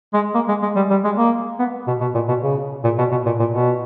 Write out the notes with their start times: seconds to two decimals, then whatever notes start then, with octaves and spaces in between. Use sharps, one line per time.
0.13 G#3
0.35 A#3
0.48 G#3
0.62 G#3
0.76 G3
0.90 G3
1.04 G#3
1.17 A#3
1.59 B3
1.87 B2
2.01 B2
2.14 A#2
2.28 B2
2.42 C#3
2.84 A#2
2.98 B2
3.11 B2
3.25 A#2
3.39 A#2
3.53 B2